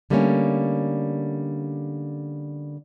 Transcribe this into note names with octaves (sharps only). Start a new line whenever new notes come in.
D3 G3 A3 A#3 C4 C#4